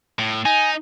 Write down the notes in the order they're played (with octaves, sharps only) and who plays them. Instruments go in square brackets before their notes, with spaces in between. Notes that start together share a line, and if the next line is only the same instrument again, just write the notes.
[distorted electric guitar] A2
[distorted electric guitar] D#4 [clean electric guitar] G#5